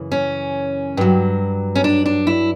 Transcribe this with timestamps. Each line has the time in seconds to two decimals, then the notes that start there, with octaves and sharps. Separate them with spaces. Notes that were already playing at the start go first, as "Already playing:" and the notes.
Already playing: F#2 C#3 E3
0.12 C#4
0.97 G2 F#3
1.75 C#4
1.84 D4
2.06 D4
2.27 E4